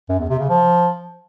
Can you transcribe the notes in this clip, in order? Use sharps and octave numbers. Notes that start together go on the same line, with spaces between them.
F#2
E2
C3
C#3
F3